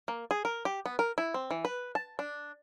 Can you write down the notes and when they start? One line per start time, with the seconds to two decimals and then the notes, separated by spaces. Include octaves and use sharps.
0.08 A#3
0.31 G#4
0.45 A#4
0.65 G4
0.86 B3
0.99 A#4
1.18 E4
1.34 C4
1.51 E3
1.65 B4
1.95 A5
2.19 D4